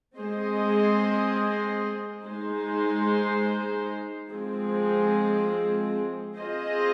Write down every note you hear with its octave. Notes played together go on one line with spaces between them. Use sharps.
G#3 C4 G#4 C5 D#5
G#3 D#4 C5
F3 G#3 C4 G#4
C4 F4 G#4 C5 D#5